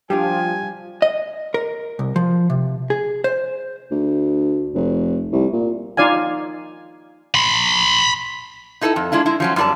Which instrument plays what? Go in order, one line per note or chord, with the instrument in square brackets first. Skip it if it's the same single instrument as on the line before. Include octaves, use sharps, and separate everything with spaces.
[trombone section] F3 [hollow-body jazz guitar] G3 D4 F4 [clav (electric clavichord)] G4 [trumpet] G#5
[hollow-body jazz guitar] D#5
A#4
C2
F3
C3
G#4
C5
[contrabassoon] D2
F1
C2
A#2
[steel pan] D#4 F4 D5 F5 G#5
[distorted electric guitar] B5 C6
[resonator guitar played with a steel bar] D#4 E4 A4 B4 D#5
F2
G#3 D4 E4 F4
G#3 E4
F3 F#3 C#4
F#2 G3 F4 D5 A5